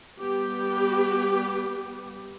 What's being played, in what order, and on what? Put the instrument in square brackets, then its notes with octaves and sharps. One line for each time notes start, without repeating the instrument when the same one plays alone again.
[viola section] G3 B3 G4